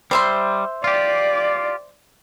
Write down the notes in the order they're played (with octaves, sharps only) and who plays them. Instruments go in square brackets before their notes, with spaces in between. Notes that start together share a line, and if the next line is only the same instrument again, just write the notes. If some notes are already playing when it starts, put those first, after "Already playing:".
[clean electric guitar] G3 [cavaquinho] C5 E5 C6
[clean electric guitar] F4 G4 [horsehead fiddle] D5